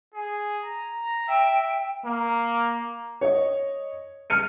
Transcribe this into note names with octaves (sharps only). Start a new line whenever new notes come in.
G#4
A#5
E5 G5
A#3
C#5 D#5
F6 C#7 D#7